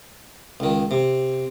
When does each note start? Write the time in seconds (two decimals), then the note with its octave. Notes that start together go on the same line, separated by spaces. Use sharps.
0.60 C#2 D#3
0.91 C3